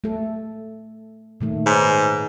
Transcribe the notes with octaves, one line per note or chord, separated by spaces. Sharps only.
A3 A4
A#2 D#3 A3
G#2 B4 C#5